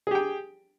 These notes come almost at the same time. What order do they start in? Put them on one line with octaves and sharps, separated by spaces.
G#4 G4 G5